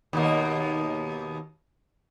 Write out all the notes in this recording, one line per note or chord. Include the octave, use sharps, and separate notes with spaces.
D#2 B2 A#3